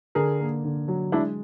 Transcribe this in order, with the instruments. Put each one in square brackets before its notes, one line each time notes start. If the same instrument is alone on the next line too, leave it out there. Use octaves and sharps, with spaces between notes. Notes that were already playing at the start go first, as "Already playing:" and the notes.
[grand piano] D3 [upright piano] G#4 A#4
[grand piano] A#3
D3
F#3
[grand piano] G#3 [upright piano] D4 E4